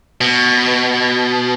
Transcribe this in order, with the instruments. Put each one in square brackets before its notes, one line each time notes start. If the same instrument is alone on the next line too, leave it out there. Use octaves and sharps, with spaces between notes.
[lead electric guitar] B2